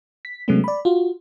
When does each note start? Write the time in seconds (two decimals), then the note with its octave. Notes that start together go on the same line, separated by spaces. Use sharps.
0.25 B6
0.48 C3 F#3 G#3 A3 B3 C#4
0.64 D5 B5
0.85 F4 F#4